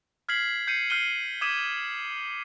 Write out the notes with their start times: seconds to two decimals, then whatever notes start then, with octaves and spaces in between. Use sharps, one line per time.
0.29 F6 G#6 B6 C7 F#7
0.67 G6 C7 C#7 D#7
0.90 F6 G6 C7 D#7 G7
1.41 D6 D#6 G#6 B6 D#7 E7